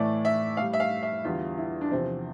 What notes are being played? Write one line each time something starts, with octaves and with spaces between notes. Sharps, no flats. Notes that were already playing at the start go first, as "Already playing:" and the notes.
Already playing: A2 E3 A3 D5
E5
A2 G3 F5
E5
F5
E5
E2 D3 G3 F4
E4
D4
E2 C3 F3 C4